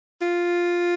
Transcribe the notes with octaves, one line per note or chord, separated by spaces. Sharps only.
F4